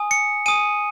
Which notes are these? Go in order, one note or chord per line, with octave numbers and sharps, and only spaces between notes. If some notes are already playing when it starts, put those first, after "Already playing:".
Already playing: G#5 D#6
C#7
G#5 D#6 D#7